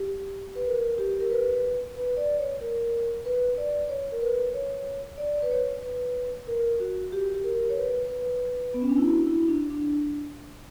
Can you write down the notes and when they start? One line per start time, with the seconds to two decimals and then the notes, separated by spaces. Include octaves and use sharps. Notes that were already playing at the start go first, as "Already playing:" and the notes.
Already playing: G4
0.55 B4
0.67 A#4
0.98 G4
1.11 G4
1.20 A#4
1.31 B4
1.95 B4
2.17 D5
2.39 C#5
2.61 A#4
3.25 B4
3.57 D5
3.89 C#5
4.12 A#4
4.21 B4
4.54 C#5
5.18 D5
5.42 B4
5.51 C#5
5.83 B4
6.47 A#4
6.80 F#4
7.12 G4
7.34 G4
7.44 A#4
7.70 C#5
7.76 B4
8.09 B4
8.74 B3
8.82 C#4
8.89 D4
8.98 E4
9.05 F#4
9.27 E4
9.48 D4
9.70 D4